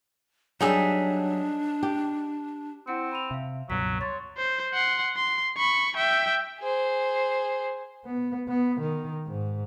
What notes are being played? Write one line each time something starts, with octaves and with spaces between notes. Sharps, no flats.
F#3 G3 D4 D#4 G#4 E5
G4
C4 E4 F#5 C#7
B5 D#7 F7
C3 E5 F5
C#2 G2 B2 F#3 B6
C#5 C6 A6
C5
F#5 C6
C6
B5 C#6
E5 G5
G#4 C5
B3
B3
D#3
G#2